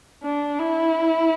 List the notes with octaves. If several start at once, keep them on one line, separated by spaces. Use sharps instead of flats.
D4
E4